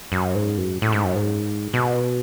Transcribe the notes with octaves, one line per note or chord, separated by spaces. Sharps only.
F#2
G#2
F#2
A2
G#2
F#2
G#2
B2